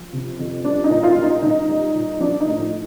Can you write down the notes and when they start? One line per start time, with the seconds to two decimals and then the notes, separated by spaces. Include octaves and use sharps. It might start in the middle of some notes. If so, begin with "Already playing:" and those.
Already playing: F3
0.13 C3
0.39 F2
0.64 G3 D4
0.84 D#4
0.90 A#2
1.03 F4
1.16 G3
1.22 D#4
1.42 A#2 D#4
1.69 G3
1.94 A#2
2.20 F3 D4
2.40 D#4
2.46 A2